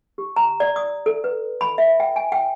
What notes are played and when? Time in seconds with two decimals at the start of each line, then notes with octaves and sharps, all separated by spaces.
0.18 G4
0.36 A#5
0.60 D5
0.76 D#6
1.06 A4
1.24 B4
1.61 B5
1.78 E5
2.00 G5
2.16 G#5
2.32 G5